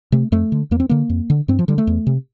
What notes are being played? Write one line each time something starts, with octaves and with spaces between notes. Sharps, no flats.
C3 A3
F2 A3
D3
E2 A#3
C4
D3 A#3
F2
D3
G2 C4
F3
D3 G3
A3
E2
C3